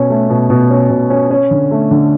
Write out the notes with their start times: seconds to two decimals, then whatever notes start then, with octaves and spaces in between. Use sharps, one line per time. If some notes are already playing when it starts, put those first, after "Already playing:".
Already playing: B2 C#4
0.10 A3
0.30 B2
0.50 B2
0.70 C#4
0.90 B2
1.10 C#4
1.31 C#4
1.51 D3
1.71 A3
1.91 D3